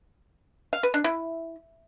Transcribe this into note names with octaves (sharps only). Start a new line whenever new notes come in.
F5
B4
D4
E4